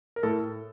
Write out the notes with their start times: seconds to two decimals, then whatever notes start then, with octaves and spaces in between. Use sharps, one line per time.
0.16 A#4
0.23 A2 A4